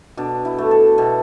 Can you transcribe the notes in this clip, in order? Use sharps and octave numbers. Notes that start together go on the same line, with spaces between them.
B2 D4
E4
A3
A4
B2